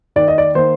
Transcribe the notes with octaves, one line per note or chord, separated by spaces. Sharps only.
D#2 D5
D#5
D5
D#3 A#3 C5